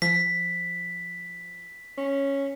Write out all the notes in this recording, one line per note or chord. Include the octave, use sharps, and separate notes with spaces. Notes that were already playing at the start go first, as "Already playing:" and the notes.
F3 B6
C#4